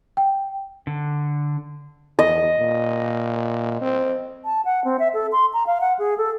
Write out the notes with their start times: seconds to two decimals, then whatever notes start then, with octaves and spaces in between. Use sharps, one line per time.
0.17 G5
0.87 D3
2.19 E2 D#5
2.58 A#2
3.82 C4
4.45 A5
4.65 F#5
4.85 C4
4.99 E5
5.14 A4
5.32 C6
5.53 A#5
5.67 F5
5.81 F#5
5.99 G#4
6.18 A4